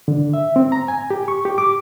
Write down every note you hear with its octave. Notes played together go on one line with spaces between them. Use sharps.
D3
E5
C4
A#5
G#5
G4
C#6
G4
D6